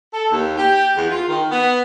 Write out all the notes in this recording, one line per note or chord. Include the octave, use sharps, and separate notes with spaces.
A4
D#2
G4
E2
F4
D#3
B3